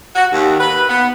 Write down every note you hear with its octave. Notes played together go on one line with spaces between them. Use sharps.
F#4
D#2
B4
B3